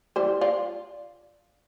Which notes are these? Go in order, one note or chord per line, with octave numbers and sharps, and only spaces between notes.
E3 G3 C5
F4 D5